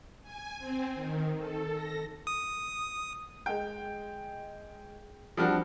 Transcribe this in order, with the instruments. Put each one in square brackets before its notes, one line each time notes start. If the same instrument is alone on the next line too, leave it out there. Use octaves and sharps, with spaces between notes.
[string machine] G#5
C4
D#3
A4
A#6
[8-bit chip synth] D#6
[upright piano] G#3 G5
F3 G3 C4 D4 F#4